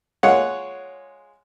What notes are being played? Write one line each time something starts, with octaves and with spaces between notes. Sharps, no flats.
G#3 F4 C#5 F#5